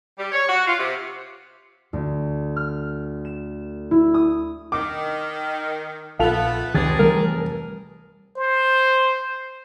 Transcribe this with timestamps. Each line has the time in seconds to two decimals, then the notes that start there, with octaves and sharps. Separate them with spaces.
0.18 G3
0.32 C#5
0.49 F#4
0.67 F4
0.79 C3
1.93 D2
2.56 F6
3.25 E7
3.91 E4
4.14 D#6
4.72 D#3 D6
6.19 A#1 A3 B3 F4 A4 F7
6.74 F1 C#2 D#3 G#3 G4 G#4 A6
6.99 E3 G3 A3 A#4
8.36 C5